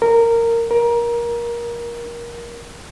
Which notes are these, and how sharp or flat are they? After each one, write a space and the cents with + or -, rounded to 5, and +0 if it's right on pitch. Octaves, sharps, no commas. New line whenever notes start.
A#4 -15
A#4 +20